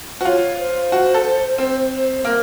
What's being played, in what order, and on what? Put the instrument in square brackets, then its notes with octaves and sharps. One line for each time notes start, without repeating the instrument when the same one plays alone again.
[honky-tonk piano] F#4 [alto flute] C5
[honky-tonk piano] F4 [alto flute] C#5
[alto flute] C5
[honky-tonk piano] F#4
A4
C4
[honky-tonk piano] A#3 [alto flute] A#4